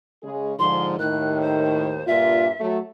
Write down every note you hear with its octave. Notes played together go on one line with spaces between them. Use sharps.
C#3 G#3 G#4
G#2 D3 F3 C6
D#2 A2 D#3 F#6
C5
G2 A#2 F4 E5
F#3 A3